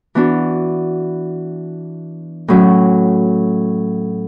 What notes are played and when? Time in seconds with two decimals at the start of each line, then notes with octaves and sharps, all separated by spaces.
0.15 E3 B3 D4 F#4
2.48 A2 F#3 C#4